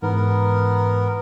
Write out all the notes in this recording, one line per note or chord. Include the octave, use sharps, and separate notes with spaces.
G#2 E3 B3 A#4